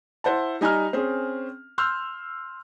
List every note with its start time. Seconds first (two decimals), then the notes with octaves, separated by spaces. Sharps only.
0.24 E4 C5 F#5 A5
0.61 G3 D#4 G#5 A#5 F6
0.93 C4 C#4 G#4
1.78 C6 E6 F6 G6